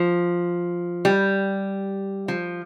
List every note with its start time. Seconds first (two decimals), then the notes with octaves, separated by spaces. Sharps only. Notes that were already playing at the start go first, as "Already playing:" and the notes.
Already playing: F3
1.05 G3
2.28 F3